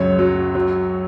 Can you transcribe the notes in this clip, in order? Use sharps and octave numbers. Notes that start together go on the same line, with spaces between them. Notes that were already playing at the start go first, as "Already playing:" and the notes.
Already playing: C#2 F#2 C#5
F#3
F#3